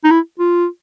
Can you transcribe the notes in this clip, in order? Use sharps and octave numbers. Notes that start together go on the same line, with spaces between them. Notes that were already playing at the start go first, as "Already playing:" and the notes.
D#4
E4
F4